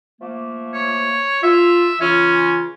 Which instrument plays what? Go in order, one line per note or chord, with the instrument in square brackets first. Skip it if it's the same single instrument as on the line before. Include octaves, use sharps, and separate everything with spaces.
[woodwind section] F3 A3 A#3
[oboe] C#5
[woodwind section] F4 [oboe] E5
[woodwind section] C#3 E3 F4 [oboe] C#4